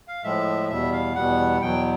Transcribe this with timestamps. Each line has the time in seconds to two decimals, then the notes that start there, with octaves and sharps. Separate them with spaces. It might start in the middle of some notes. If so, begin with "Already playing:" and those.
0.08 F5
0.24 A2 F3 G#3 E5
0.69 E2 B2 G3 E5
0.92 F5
1.15 E2 B2 G3 F#5
1.61 E2 B2 F#3 G5